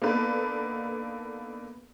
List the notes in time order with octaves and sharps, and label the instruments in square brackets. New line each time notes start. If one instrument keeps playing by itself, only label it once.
[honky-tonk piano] A#3 B3 D4 D#4 A4 B4